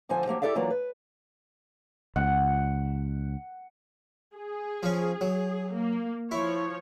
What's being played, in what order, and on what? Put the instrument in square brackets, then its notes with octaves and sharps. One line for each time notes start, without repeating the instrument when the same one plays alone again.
[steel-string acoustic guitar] D2 D3 F3 C5 G#5
F3 F#3 A#3 G4
E4 G4 A4 D5 E5 F5
E3 F#3 A#3 D4 F4 F#4
B4
[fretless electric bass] C#2 [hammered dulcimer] F#5
[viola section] G#4
[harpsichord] F3 C#4
F#3
[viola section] A#3
[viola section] F3 C#5 [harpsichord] E4